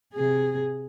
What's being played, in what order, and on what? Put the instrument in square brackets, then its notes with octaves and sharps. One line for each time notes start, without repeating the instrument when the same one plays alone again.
[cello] C3 G#4